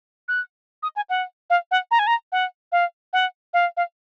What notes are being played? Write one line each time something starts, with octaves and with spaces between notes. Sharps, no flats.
F#6
D#6
G#5
F#5
F5
F#5
A#5
G#5
A#5
F#5
F5
F#5
F5
F5